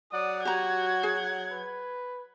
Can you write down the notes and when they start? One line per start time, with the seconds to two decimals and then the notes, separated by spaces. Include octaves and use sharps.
0.13 F#3 D5 F#5 D#6
0.45 F#4 G4 A#5 G#6
1.03 G#4
1.51 B4